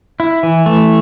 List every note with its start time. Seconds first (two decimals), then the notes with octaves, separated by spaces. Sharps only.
0.20 E4
0.43 E3
0.66 A3